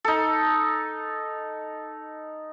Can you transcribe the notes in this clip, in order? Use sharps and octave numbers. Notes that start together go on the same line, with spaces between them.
D#4 A4